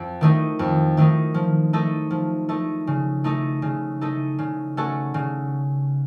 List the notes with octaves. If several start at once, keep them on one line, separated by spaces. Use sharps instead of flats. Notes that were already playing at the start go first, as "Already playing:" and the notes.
Already playing: F2
D#3 A3 D#4
F2
D#3 A3 D#4
F3
A3 D#4 A4
F3
A3 D#4 A4
C#3
A3 D#4 A4
C#3
A3 D#4 A4
C#3
A3 C#4 F#4 A4
C#3